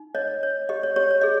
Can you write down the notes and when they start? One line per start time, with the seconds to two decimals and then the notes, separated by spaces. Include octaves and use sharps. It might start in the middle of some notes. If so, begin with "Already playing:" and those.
Already playing: D#4
0.15 C#5 D#5
0.43 C#5
0.69 G4 D#5
0.83 C#5
0.96 G4 C#5
1.11 C#5
1.21 G#4 D#5